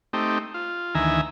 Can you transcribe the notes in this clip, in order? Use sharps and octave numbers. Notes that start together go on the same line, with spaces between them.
A3 C4 D#4 G4
F4
D2 D#3 E3 E5 G#5 A#5